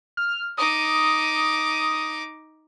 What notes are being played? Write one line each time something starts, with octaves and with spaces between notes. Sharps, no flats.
F6
D#4 D6 D#6